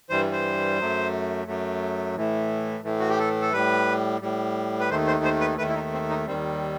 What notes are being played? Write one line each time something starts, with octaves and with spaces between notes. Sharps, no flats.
G2 E3 G3 C5
C5
F#2 F#3 A3
F#2 F#3 A3
A2 E3 A3
A2 E3 A3
F#4
G4
A4
A4
A2 G3 B4
A2 G3
B4
D#2 D#3 A3 C5
C5
C5
B4
D#2 D#3 A3 B4
E4
D#4
C4
D#4
D#2 D#3 G3 C4